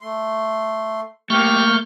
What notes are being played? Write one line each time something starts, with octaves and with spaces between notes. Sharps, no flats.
A3 C6
A3 A#3 G4 C#6 F6 G6